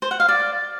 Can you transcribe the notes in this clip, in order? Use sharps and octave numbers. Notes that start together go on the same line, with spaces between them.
C5
F#5
F5
D5